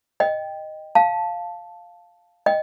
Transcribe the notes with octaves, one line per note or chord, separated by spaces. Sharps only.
D#5 G5
F5 A5
D#5 G5